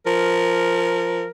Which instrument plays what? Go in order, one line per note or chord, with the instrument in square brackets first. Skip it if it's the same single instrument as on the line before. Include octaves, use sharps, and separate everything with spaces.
[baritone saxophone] F3 [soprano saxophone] A#4